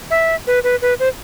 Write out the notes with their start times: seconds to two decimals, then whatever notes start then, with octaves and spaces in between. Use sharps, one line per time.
0.11 E5
0.47 B4
0.64 B4
0.82 B4
1.00 C5